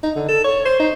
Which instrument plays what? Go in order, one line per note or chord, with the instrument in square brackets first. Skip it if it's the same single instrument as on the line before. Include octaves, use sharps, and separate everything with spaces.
[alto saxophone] D#4
D3
A4
C#5
C5
D#4